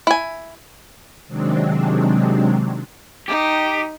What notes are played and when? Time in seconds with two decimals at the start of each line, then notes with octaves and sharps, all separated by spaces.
0.07 E4 G#5
1.27 C3 D#3 F#3 G#3 C4 D4
3.28 D#4 G4